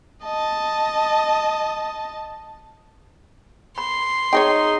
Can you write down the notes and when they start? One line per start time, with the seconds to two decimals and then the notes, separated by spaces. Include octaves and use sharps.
0.23 D#5 A5
3.78 B5 C6
4.33 D#4 G#4 C#5 D#5 G5